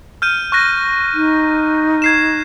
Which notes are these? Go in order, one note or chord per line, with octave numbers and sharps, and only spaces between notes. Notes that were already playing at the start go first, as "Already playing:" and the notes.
F6 G6 D#7
C#6 F#6 A#6
D#4
G#6 C7 E7